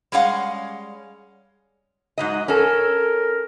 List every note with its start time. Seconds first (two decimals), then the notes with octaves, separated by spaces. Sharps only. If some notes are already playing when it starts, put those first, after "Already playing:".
0.12 G3 G#3 C#4 F5 F#5
2.18 G#2 F#3 D#5
2.48 C#4 A4 A#4